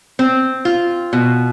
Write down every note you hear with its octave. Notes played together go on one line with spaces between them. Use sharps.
C4
F4
B2